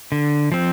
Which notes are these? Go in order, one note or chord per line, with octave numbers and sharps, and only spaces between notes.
D3
F3 C4